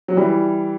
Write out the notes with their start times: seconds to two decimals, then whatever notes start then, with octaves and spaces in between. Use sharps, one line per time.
0.08 F#3
0.17 E3 G3